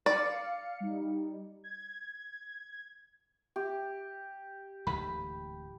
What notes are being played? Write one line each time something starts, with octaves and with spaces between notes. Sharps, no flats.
D5 F5 C#7
G3 D#4
G#6
G4
D1 G#2 E3 B5